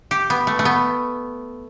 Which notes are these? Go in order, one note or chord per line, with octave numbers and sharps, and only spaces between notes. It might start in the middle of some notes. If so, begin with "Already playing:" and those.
G4
B3
A3
A3
B3